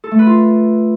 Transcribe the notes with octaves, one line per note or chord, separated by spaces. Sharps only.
A4
A3
B4
F4